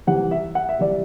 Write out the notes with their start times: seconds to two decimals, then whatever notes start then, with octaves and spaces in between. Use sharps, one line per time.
0.07 C3 E3 G3 F#5
0.31 E5
0.55 F#5
0.69 E5
0.79 C3 E3 G3 D5